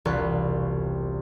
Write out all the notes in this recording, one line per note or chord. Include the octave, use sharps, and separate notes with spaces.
E1 C2 F4 B4 F#6